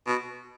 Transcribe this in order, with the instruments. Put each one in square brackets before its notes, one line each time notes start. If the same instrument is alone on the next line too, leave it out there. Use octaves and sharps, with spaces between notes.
[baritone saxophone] B2